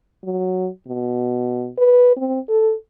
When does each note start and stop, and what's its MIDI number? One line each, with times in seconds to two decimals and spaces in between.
0.24 0.68 54
0.88 1.69 47
1.78 2.16 71
2.17 2.39 60
2.49 2.73 69